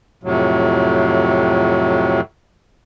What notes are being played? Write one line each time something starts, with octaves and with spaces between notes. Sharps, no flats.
F2 A2 C3 F#3